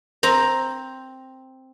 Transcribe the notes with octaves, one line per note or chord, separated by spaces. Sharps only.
C4 A#5